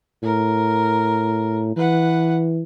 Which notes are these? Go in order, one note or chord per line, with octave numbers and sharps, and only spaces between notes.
A2 A#4
E3 B4 F#5